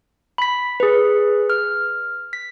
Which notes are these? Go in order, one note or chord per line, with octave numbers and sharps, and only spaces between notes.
B5 B6
G#4 B4
F6
B6